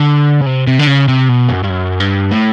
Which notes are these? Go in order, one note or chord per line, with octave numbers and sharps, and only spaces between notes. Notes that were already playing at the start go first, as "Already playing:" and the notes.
Already playing: D3
C#3
C3
C3
D3
C#3
C3
B2
F#2
G2
F#2
G2
A2